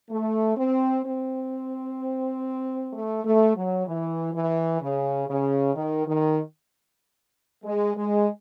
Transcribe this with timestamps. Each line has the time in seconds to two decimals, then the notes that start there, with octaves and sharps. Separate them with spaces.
0.10 A3
0.57 C4
1.05 C4
2.93 A3
3.25 A3
3.56 F#3
3.87 E3
4.34 E3
4.81 C#3
5.28 C#3
5.75 D#3
6.06 D#3
7.64 G#3
7.95 G#3